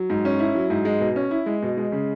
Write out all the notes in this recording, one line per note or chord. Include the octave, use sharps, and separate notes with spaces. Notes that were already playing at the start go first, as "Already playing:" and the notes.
Already playing: F#3
G#2
C#4
E4
F#3
G#2
G#3
B2
C#4
E4
G#3
B2
G#3
C#3